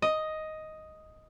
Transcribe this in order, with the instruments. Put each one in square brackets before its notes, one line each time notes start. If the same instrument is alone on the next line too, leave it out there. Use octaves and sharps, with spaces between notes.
[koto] D#5